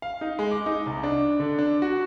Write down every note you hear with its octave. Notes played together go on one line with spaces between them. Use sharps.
F5
D#4
G#3
D6
D#4
C2
D4
D3
D4
F#4